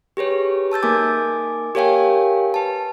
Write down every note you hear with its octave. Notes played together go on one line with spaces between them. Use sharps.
G4 G#4 B4 C#5
A5 E6 G6 A6
A#3 D#4 A#4 G#5 D6
G4 A#4 C#5 F5 G5 G#5
B4 A5